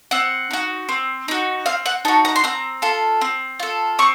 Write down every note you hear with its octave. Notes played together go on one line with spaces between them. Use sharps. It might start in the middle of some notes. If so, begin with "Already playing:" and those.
C4 F#5
D#4 F#4
C4
D#4 F#4
C4 F5
F#5
D#4 F#4 A5
A#5
C6
C4 A#5
F4 A4
C4
F4 A4
C4 C#6